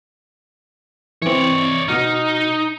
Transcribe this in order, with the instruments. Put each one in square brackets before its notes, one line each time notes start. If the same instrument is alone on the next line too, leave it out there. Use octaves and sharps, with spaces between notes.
[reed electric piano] E3 C4 [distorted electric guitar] C#5 D5
[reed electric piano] B2 F#4 F6 [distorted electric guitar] D#4